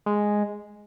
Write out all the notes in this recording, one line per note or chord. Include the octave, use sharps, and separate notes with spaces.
G#3